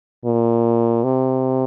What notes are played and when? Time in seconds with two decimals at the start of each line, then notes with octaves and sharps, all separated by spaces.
0.25 A#2
1.04 C3